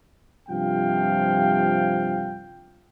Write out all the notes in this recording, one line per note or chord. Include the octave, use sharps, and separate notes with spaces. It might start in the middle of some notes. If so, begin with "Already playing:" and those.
G2 C3 F3 F4 F5 G5